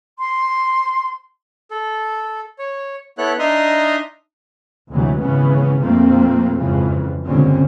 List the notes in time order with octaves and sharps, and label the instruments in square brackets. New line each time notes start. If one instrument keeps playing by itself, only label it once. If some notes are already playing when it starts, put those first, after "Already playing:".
[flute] C6
[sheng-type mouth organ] A4
C#5
B3 E4 A4 C#5 F#6
D4 D#4 D#5 E5 A#5 C6
[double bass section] D2 G#2 C3 E3 F#3 A3
G#1 C#3 E3 B3 C#4
A#1 F2 F3 A3 A#3 C4
F2 G#2 C#3 E3 F3
G1 C#2 A#2 D3 C4 C#4